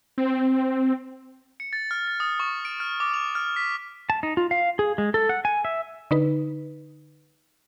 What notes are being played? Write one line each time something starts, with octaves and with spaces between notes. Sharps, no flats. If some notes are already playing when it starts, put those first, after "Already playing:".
C4
C#7
A6
F6
A6
D#6
C#6
D7
F6
D6
F7
F6
B6
A5
D#4
F4
F5
G#4
G#3
A4
F#5
G#5
E5
D3 D#4 B4